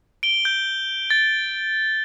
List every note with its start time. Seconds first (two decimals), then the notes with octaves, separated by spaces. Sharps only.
0.23 D7 G7
0.45 G6
1.10 A6